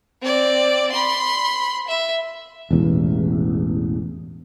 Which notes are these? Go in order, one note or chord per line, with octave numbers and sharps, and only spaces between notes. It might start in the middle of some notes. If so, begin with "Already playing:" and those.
C4 D5
B5 C6
E5
E1 A1 E2